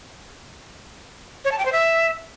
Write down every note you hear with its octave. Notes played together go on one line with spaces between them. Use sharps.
C#5
A5
G5
C5
E5